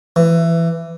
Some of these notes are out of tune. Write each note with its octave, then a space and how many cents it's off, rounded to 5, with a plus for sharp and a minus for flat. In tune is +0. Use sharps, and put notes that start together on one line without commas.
E3 +15